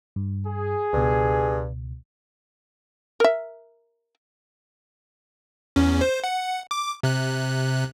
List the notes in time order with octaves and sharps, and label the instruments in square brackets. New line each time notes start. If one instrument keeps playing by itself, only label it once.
[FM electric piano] G2
[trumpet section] G#4
[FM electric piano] C#2 B2 [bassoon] G2
[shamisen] A#4 E5
[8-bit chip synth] E2 C#4
C5
F#5
D6
C3 F#6